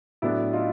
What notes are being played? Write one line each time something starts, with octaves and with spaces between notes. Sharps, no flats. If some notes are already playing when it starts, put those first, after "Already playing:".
A2 F#3 B3 D4 E4
D#4 F4